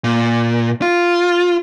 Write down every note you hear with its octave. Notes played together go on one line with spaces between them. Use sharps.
A#2
F4